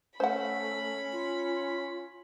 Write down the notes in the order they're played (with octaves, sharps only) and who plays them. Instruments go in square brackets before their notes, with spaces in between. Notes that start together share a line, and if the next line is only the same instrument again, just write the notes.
[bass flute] A3 [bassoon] C#4 [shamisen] C5 F#5 [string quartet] B5
[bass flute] F4